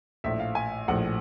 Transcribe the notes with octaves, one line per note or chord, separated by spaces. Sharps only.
A#1 A2 F3 E5
F5
G#5
A#1 A2 F3 F#5